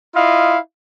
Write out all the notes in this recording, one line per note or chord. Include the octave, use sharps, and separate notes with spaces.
E4 F4 D#5 F5